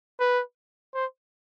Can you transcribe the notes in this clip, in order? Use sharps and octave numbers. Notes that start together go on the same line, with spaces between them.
B4
C5